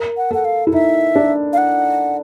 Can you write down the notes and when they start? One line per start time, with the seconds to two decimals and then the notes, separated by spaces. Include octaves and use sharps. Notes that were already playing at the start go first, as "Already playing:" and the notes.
Already playing: A#4
0.17 F#5
0.31 A4 F#5
0.45 F5
0.67 E4
0.73 D#4 E5
1.16 D4
1.53 F5
1.58 F#5